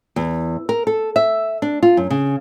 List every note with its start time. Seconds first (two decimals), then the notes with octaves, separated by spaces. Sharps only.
0.16 E2
0.69 A#4
0.87 A4
1.16 E5
1.62 D4
1.83 F4
1.97 F#2
2.10 C#3